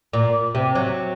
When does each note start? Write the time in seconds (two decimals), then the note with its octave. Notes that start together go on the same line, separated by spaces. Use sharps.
0.13 A#2
0.55 C3
0.75 F#3